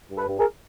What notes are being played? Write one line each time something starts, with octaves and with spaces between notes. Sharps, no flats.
G2
A4 B4
G2
G#4 A#4